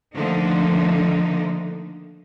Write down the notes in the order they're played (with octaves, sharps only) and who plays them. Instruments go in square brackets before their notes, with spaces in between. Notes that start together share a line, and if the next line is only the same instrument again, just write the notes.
[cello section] D3 D#3 F3 A3 A#3 D#4